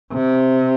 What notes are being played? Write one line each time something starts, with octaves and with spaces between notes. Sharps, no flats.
C3